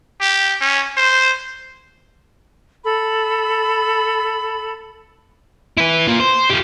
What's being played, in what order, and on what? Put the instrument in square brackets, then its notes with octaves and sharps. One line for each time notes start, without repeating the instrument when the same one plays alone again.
[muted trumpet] G4
C#4
C5
[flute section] A4 B5
[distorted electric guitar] E4 B4
A#3 F4
C5
F4 G4